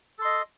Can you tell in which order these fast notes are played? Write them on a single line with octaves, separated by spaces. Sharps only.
A4 C6 D#5